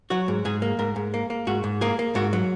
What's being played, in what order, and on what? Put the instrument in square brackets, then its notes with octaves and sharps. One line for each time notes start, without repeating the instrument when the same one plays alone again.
[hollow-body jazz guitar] F#3 F#4
G#2
G#2 G#4
A#3
G#2 A#4
G#2
A#3
A#3
G#2 F#4
G#2
A#3 G#4
A#3
G#2 F#4
F#3